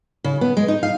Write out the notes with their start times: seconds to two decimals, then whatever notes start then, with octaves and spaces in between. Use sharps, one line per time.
0.24 C#3
0.41 B3
0.57 G#3
0.68 D#4
0.83 F5